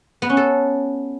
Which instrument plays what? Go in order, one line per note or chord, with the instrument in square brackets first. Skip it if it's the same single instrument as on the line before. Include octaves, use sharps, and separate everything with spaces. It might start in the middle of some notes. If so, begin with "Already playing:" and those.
[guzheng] B3
C#4
A4